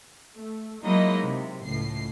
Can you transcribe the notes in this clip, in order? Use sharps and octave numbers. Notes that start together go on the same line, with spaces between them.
A3
F#3 G#3 A#3 D#4 E4 D#5
C3
C#2 A2 C7